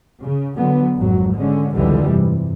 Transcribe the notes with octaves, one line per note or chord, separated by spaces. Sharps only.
C#3
D3 F#3 B3
G#1 F2 F#3
D3 G#3 C#4
F1 C#2 D3 E3 G3 G#3
G2 C3